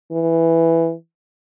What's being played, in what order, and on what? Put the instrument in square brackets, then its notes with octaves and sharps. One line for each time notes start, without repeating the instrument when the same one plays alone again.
[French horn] E3